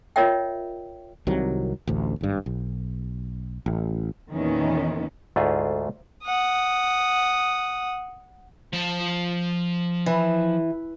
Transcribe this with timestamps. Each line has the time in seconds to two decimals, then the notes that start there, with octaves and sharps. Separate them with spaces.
0.16 F4 A#4 C#5 D#5 E5 G5
1.27 C2 C3 D#3 F#3
1.87 A1 D2
2.21 G#1 G2
2.46 B1
3.66 A1
4.32 E2 A#2 D#3 E3 C#4
5.36 D2 G#2 A3 F4 G#4
6.24 F#5 D#6
8.73 F3 A5
10.06 E3